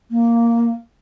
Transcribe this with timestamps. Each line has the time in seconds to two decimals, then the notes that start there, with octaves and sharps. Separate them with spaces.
0.10 A#3